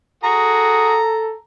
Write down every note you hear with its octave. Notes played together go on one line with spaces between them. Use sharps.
F#4 G#4 A4 A#5